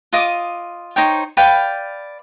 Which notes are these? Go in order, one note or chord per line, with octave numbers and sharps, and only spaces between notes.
F4 D#5 D6 D#6
D#4 C5 C#5 G5
B4 D5 F5 G5